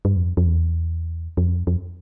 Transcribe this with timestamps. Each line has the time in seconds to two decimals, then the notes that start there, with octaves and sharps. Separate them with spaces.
0.05 G2
0.16 F2
0.37 F2
0.46 E2
1.37 F2
1.67 F2